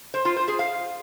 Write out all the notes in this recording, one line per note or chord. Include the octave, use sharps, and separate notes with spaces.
C5
F4
C5
G#4
F5